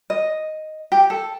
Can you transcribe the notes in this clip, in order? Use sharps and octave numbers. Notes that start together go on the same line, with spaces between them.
D#5
G4
A4